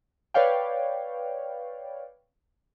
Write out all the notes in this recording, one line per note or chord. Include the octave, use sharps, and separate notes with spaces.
B4 C#5 D5 F5 G5